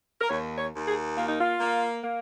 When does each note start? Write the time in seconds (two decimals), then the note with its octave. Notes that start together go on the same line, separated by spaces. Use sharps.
0.21 A#4
0.29 D#2 C#5
0.58 C#5
0.73 D#2
0.87 G#4
1.16 A#3 F4
1.29 D#4
1.41 F4
1.60 A#3
2.04 A#3